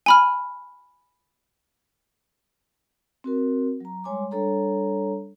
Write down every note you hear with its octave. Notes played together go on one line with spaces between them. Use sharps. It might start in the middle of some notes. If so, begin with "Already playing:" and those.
G#5 B5 F6
C4 F#4 A#4
F#3 A#5
G3 G#3 C#5 G#5 C6 D6
G3 D4 A4 C#5 A#5